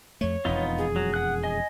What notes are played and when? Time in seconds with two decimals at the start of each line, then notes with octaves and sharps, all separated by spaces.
0.21 F2 A3 C#5
0.45 E1 F2 B3 D#4 F4
0.78 G#4
0.96 F#3
1.14 F#5 F#6
1.43 D#5 G#5